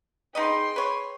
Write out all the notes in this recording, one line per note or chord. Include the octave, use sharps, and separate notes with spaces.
D#4 G#4 B4 D#5 G5 C6
B4 C#5